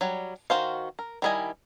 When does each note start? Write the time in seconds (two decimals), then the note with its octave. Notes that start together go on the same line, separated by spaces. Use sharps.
0.01 F#3 G3
0.50 D#3 E4 F#4 C5 F5
0.99 A#4
1.22 D#3 G3 E4 D#5 G#5